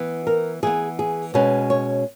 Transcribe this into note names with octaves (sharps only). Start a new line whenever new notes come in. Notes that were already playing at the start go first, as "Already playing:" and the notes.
Already playing: E3 B3
A#4
E3 B3 G#4
G#4
B2 G#3 C#4 B4
C#5